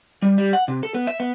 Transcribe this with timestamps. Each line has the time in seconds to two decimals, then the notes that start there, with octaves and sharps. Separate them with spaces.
0.22 G3
0.38 G3
0.53 F#5
0.68 C3
0.83 A4
0.95 B3
1.07 E5
1.20 B3